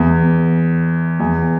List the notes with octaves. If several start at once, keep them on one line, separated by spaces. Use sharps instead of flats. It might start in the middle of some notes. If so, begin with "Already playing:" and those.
Already playing: E2
E2